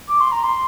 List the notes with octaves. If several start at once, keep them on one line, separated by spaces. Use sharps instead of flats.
D6
C6
A#5
C6